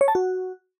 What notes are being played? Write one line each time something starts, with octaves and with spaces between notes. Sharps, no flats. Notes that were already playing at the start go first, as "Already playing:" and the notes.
C#5
A5
F#4